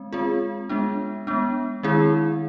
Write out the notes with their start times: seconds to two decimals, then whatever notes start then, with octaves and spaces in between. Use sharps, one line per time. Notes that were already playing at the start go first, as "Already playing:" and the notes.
Already playing: G#3 C4
0.13 G#3 C4 F4 G#4
0.69 G#3 B3 D4
1.27 G#3 B3 D4
1.83 D#3 G#3 C4 E4 G#4